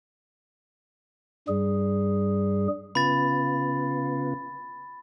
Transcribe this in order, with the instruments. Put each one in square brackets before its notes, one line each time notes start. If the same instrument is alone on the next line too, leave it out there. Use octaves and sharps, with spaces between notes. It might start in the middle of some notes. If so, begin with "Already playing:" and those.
[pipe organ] G2 G3 G#4
[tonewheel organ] C#3 B3 F4 [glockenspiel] B5 A6